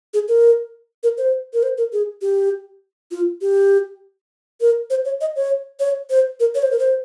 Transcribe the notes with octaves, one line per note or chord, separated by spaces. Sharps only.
G#4
A#4
A#4
C5
A#4
C5
A#4
G#4
G4
F4
G4
A#4
C5
C#5
D#5
C#5
C#5
C5
A#4
C#5
C5
A#4
C5